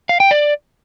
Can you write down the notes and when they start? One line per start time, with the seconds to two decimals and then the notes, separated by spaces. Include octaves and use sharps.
0.09 F5
0.20 G5
0.31 D5